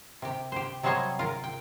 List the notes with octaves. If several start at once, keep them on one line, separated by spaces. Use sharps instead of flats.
C3 G4
G4 C5
C3 F#3 G3 C5 C#5 D#5
F4 A#4
G5